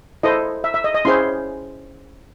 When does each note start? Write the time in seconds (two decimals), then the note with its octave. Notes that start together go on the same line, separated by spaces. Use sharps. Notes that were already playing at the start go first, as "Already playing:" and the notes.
0.23 E4 A4 C5 D#5
0.64 E5
0.74 E5
0.84 D#5
0.95 D#5
1.05 C#4 E4 G#4 C5 C6